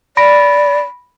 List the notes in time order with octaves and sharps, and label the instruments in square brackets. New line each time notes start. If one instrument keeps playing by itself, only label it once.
[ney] D5 [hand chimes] B5 A#6 D7